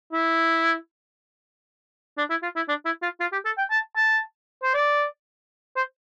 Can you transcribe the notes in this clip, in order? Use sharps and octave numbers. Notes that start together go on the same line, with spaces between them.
E4
D4
E4
F4
E4
D4
E4
F4
F4
G4
A4
G5
A5
A5
C5
D5
C5